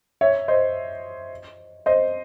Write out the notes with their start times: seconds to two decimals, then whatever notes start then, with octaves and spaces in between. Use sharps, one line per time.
0.21 C#5 E5
0.48 C5 D#5
1.86 C5 D#5